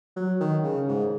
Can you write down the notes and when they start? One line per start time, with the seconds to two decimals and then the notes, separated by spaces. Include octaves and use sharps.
0.16 F#3
0.40 D#3
0.63 C#3
0.88 G#2